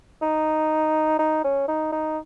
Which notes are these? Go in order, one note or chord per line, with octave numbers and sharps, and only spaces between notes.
D#4
D#4
C#4
D#4
D#4